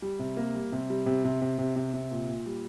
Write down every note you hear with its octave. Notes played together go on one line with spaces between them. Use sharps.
G3
C3
A#3
G3
C3
G3
C3
C3
C3
C3
C3
C3
A#2
A#2
G3